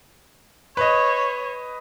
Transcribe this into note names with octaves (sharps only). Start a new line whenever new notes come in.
B4 C#5 D#5